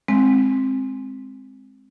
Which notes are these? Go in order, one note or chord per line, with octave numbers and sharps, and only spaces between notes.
G#3 C4